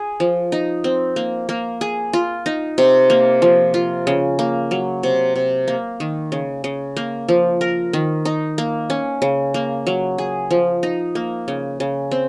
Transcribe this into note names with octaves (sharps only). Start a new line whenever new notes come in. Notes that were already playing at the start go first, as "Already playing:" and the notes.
Already playing: G#4
F3
D#4
C4
A#3
A#3
G#4
F4
D#4
C3
A#3
F3
F4
C#3
A#3
F#3
C3
C3
A#3
D#3
C#3
C#3
A#3
F3
A#4
D#3
D#4
A#3
C#4
C#3
A#3
F#3
G#4
F3
D#4
A#3
C#3
C#3
C4